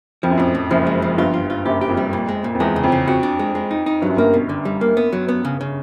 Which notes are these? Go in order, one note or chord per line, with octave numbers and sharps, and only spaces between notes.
F2 F3
F#2
F2 A2
A2
F#1 F#2 F3
G#3
F3
G1 G2 F4
F4
F4
F#1 F#2 G4
G4
F2
G3
A#2
G#3
A#2
F2
E2 G#3
C#3
F2
C#3
F2 F#4
D4
G#3
G#3
D#4
D#4
G2 F#3
F#2
G1 G2 A#3
B2
D3
G3
A#3
B3
F#3
B3
C#3
C#3